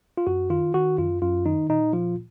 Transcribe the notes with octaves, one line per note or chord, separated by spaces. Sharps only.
F4
F#2 F#4
D#3 F4
D#3 F#4
F#2 F4
F#2 F4
D#3 D#4
A#2 D#4
F3 F4